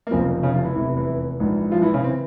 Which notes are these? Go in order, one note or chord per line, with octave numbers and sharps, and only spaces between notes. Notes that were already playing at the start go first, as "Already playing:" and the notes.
A#3
F1 F2 C#3 F3 C4
C#3 C#4
F3 F4
E3 E4
F1 E2 C3 E3 E4
E3 E4
A#1 G#2 E3
F3 F4
E3 E4
C#3 C#4
C4
E3